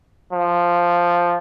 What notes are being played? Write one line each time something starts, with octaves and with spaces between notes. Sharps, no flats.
F3